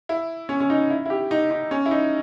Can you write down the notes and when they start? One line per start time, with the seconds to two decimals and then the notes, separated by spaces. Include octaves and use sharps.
0.09 E4
0.49 C#4
0.60 C#4
0.70 D#4
0.90 E4
1.06 E4
1.10 G4
1.31 D#4
1.51 D#4
1.71 C#4
1.86 E4
1.91 D#4